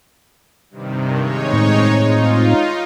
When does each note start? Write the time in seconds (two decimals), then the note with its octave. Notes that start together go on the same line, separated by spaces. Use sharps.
0.70 G2 C3 D#3
1.18 G#3 D#4 C#5
1.53 A2 C4
2.03 D#4 F4